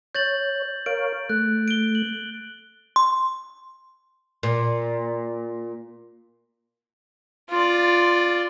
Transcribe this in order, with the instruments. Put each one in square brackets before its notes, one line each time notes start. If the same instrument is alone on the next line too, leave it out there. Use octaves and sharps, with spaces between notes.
[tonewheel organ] C#5 [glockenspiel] G6 A6 F#7
[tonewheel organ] A#4 C#5 F5 [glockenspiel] D7
[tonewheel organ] A3 [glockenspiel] F#6
[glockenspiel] D7 G7
F#7
[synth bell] C6
[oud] A#2
[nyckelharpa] F4 D5